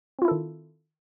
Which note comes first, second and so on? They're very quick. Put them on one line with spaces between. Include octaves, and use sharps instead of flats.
C4 F4 E4 A4 D#3